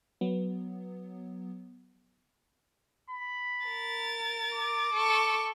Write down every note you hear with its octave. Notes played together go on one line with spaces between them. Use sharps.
F#3 B3
B5
A#4 A6
D6
A4 C#6